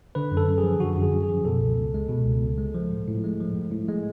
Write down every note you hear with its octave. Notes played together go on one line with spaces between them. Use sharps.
D3 B4
F#2
A4
F#2
G#4
F3
D3 F#4
F#2 F#4
G#4
F#2
G#4
F3
B2 A4
C#2
C#2
G#3
B2
C#2
C#2
G#3
F3
A2
A2
G#3
F3
A2
A2
G#3